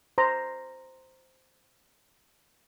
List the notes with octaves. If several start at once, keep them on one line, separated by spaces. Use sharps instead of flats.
C5 A#5